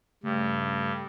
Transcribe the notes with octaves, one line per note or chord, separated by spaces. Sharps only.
G2 C#3 A3